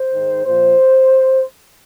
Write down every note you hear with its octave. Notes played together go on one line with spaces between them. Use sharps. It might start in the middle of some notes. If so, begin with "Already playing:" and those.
Already playing: C5
G#2 D#3
A#2 F3 C5